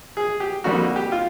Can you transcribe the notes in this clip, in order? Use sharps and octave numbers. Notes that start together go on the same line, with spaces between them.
G#4
G4
F2 D3 G3 A#3 D#4 F#4
G4
F4